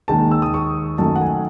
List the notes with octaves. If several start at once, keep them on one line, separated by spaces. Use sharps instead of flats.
D#2 D#3 G#3 A5
E6
D#6
C#6
F#2 D#3 A3 A5
F#5
G#5